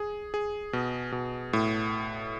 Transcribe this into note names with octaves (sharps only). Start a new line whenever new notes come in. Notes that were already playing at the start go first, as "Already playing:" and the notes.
Already playing: G#4
G#4
B2
B2
A2